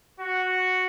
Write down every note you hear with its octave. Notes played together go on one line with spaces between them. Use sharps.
F#4